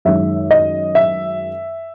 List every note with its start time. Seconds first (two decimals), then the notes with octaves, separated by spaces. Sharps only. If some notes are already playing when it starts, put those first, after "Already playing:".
0.05 F#2 D#3 G#3 E5
0.51 D#5
0.95 E5